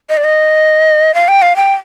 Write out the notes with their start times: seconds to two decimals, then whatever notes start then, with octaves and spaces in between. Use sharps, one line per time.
0.09 D#5
0.17 D5
0.24 D#5
1.15 F5
1.28 G5
1.42 F5
1.56 G5